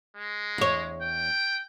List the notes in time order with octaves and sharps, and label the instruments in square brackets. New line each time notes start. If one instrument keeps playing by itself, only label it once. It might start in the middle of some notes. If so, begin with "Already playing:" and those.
[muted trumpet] G#3
[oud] E2 C#5
[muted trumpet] G5